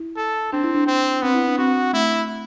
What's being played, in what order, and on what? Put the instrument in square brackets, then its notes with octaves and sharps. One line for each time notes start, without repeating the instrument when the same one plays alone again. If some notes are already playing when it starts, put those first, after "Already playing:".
Already playing: [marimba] E4
[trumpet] A4
[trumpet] C4 [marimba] D4
[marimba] E4
D4
[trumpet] C4
[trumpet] B3 [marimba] C4
[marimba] E4
D4
[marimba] C4 [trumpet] F#4
[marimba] A3 [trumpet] E4